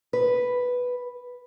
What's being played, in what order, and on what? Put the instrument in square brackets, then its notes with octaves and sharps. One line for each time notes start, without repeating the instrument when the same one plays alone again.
[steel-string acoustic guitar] B4